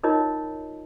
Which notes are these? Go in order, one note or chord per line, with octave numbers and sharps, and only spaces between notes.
D#4 F4 A#4 C#5 D#5